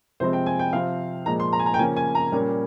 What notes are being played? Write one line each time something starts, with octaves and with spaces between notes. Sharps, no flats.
C3 F3 G#3 C4 C5
G5
G#5
G5
C3 F3 C4 F5
A#2 F3 G#3 A#5
C6
A#5
G#5
A#5
G5
C#3 F3 A#3 C#4 G#5
G#5
A#5
A#2 G3 A#3 C#4